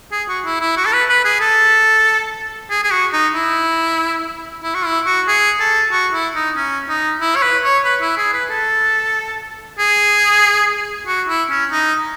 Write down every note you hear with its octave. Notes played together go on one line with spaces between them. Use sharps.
G#4
F#4
E4
E4
F#4
A4
B4
B4
G#4
A4
G#4
G#4
F#4
D#4
E4
E4
F#4
E4
F#4
G#4
A4
F#4
E4
D#4
C#4
D#4
E4
C#5
B4
C#5
B4
E4
G#4
B4
A4
G#4
F#4
E4
C#4
D#4